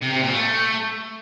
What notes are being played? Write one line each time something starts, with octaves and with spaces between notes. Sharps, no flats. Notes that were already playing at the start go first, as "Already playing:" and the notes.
C3
C3
A#2
A3